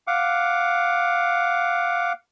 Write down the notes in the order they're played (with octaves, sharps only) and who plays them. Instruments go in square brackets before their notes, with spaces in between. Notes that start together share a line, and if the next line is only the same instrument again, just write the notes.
[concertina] F5 F#5 D6